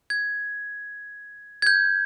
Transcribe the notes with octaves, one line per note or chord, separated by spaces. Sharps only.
G#6
G6 G#6